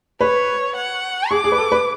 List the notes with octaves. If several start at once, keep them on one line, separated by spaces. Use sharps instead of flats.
B4 C#5
F#5
G#4 D6
G#4
B4
A4
B4